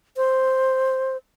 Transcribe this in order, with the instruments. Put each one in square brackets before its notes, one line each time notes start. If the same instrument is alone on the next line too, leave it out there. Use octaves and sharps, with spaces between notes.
[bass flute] C5